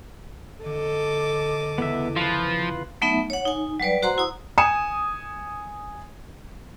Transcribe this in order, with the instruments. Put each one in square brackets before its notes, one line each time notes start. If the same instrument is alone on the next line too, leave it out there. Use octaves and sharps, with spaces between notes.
[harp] D3 [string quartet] A4 D#5 D6
[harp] E2 C#3 [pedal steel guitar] B3 E5
[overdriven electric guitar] F3 [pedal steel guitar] F4 B4
[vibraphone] F#3 A3 B3 D#4 E5
C#5 F#5
D#4 G#5
F#3 G3 B4 D5
F#4 C5 F#5 A#5 C6
E4 D#6
[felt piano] G#5 D#6 C#7 E7